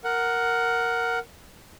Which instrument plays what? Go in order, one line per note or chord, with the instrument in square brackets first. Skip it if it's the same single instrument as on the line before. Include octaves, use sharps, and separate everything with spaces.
[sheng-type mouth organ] A#4 F#5